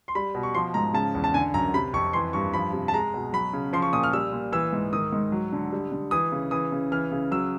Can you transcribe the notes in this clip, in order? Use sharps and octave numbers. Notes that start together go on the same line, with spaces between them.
C6
G3 B5
B2
C#6
F3 C6
G#2 A#5
C#3 A5
E2
A5
D3 G#5
F#2 A#5
C3 B5
F2 C#6
E3 C6
G2 C#6
F3 B5
C3
A5
G#3 A#5
B2
F#3 B5
C#3
F3 C6
C#6
A#2 D#6
F6
G3 E6
A#2
E3 E6
G#2
D#3 D#6
G#2
F#3
D3
G3
D3
E3 D#6
C#3
E3 D#6
C#3
E3 F6
C#3
F#3 E6